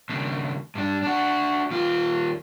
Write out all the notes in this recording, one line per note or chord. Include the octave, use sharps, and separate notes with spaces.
D#2 C#3
G2 D4
D4 F#4
D#2 F4